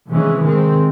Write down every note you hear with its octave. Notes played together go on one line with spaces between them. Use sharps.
C3 E3 G#3 C#4
C3 D#3 G#3 C4